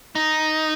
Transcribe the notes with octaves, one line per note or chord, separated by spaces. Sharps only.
D#4